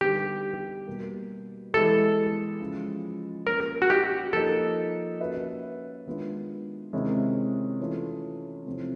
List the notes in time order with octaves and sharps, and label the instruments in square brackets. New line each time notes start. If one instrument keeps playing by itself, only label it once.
[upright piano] D3 G3 B3 D#4 [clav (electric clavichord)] G4
[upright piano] B2 G3 A#3
[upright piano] E3 G#3 B3 E4 G4 [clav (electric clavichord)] A4
[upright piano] C#3 F3 G#3
[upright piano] A#3 C#4 F4 [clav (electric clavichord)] A#4
[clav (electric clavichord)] F#4
G4
[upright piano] F3 A#3 D#4 G4 [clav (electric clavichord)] A4
[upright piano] A#3 C#4 F#4 B4 E5
D#3 G#3 B3 D4 F4
C3 D#3 G#3 C#4 E4
E3 A3 C#4 F4
C3 F3 A3 C4 E4